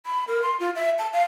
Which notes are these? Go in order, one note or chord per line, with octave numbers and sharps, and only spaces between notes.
B5
A#4
C6
F4
E5
A5
F5